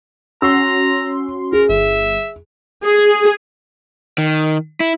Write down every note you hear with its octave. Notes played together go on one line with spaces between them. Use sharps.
C#4 F#4 A#5 C6 E6
G#4 A#4
G1 E5
G#4
D#3
E4